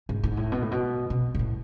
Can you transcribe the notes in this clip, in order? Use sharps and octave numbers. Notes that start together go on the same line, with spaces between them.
G#2
G#2
A2
B2
A2
B2
B2
G#2
A2